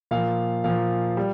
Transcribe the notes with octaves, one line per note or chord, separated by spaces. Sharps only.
A#2 F3 F5
A#2 F3 F5
G3